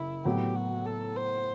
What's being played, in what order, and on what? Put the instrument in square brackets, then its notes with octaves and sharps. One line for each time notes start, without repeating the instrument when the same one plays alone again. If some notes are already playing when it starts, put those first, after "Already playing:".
Already playing: [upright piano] F#1 [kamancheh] E4
[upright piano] A2 F#3 B3 [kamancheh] G4
[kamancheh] F#4
A4
C5